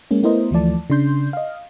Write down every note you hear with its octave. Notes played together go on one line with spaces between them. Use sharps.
G#3 A#3 C#4
A3 B3 E4 A#4 C5 D#5
D2 E3 F3 A3 D5 A5
C#3 D4 C6 G6
D#5 F5